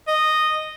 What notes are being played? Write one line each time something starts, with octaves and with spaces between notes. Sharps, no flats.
D#5